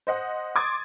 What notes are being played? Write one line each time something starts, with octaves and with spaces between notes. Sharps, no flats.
C5 D#5 F#5
C6 D6 D#6 G#6 A6